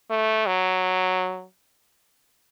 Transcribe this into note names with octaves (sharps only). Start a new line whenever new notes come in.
A3
F#3